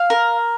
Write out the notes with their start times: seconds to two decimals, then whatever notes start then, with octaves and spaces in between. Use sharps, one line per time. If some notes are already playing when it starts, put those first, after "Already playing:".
Already playing: F5
0.10 A#4